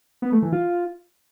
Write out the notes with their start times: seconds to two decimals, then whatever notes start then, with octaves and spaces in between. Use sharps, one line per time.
0.22 B3
0.32 A3
0.42 E3
0.53 F4